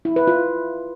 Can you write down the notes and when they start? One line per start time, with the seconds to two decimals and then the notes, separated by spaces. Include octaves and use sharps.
0.05 E4
0.16 B4
0.27 F4